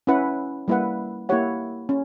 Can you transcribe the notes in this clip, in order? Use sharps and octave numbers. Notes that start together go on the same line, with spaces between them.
C#4 E4 B4 F#5
G3 A#3 E4 B4 F#5
A#3 E4 G4 C#5 F#5
C#4